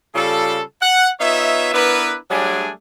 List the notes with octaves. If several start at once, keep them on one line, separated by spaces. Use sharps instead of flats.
C#3 G3 F4 A4
F#5
B3 D#4 F4 C#5 E5
B3 D4 E4 A#4 B4
F#3 G3 A3 D4 G#4 G#5